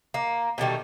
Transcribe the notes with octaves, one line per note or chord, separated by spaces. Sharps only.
A#3
B2 D#3 G3 A3